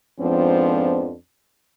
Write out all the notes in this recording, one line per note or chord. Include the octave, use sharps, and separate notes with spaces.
F2 G#2 F3 B3 C4 D4